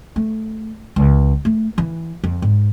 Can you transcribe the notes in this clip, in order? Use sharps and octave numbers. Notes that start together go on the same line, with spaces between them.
A3
C#2
A3
E3
F2
G#2